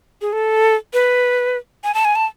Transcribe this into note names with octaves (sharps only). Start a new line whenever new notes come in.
G#4
A4
B4
G#5
A5
G#5
A5